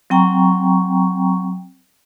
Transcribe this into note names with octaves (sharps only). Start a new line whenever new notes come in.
F#3 C4 G5 A#5 C#6